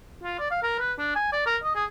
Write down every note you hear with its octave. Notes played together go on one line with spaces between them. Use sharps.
F4
D5
F5
A#4
B4
D4
G#5
D5
A#4
D#5
G#4